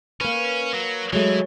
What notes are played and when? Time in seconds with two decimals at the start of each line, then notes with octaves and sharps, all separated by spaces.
0.21 A#3 C#4 B4
0.74 F#3
1.13 E3 F#3 G#3 A3